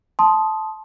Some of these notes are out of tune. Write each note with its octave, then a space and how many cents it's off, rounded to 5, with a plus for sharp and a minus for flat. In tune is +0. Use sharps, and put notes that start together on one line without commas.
A5 -15 C6 +0 D#6 +0